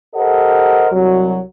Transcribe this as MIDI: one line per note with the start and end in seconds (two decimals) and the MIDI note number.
0.15 0.87 67
0.15 0.87 69
0.15 0.87 70
0.15 0.87 72
0.15 0.87 75
0.15 0.87 78
0.92 1.39 36
0.92 1.39 54